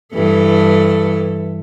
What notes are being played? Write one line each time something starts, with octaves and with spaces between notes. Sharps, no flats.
G2 E3 A4